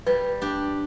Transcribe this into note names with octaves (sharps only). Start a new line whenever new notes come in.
G3 B4
D4 G4